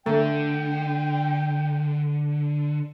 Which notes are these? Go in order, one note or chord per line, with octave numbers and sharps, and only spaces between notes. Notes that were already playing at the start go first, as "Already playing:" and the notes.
D3 A3 G5